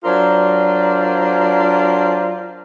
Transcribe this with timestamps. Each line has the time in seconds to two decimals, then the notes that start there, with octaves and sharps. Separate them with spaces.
0.04 F#3 D4 F4 A#4 C5 D5